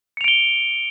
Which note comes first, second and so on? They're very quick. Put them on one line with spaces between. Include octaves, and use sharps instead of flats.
C#7 F7 D7 G7